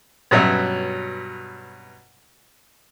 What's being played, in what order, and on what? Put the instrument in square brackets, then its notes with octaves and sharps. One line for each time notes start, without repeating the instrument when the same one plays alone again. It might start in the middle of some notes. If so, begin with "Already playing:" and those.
[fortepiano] G2 B2 F#3 C#4 E5